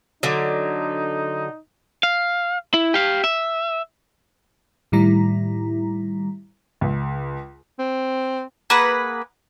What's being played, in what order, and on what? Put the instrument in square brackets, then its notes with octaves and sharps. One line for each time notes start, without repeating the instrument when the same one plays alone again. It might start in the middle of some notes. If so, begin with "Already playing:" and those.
[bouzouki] D3 F#3 [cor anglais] D#4
[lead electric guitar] F5
E4
G4 F5
E5
[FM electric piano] A2 D#3 G3 E4 A#5
[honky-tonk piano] C#2
[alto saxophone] C4
[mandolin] A#3 G#4 B4 F#5